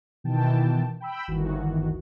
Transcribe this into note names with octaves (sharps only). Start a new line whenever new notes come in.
B2 D#3 E3 G5 A5
G5 B5 E6
G1 D2 D#3 E3 F#4